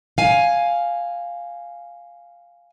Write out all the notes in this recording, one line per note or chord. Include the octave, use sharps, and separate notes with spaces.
F5 G#5